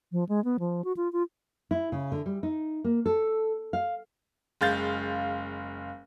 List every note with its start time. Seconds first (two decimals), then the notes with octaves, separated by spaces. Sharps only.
0.12 F3
0.29 G#3
0.44 B3
0.59 F3
0.84 F#4
0.97 F4
1.13 F4
1.71 E4
1.92 C#3
2.12 D3
2.26 G3
2.43 D#4
2.84 A#3
3.06 A4
3.73 F5
4.61 F#1 G#3 F5 G6 A6